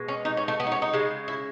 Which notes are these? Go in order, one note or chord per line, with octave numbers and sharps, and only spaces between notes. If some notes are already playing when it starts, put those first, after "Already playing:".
Already playing: B2 G#3
C#4
D#4
C#4
A3
B3
D#4
C#4
D#4
C#3 G#3
E4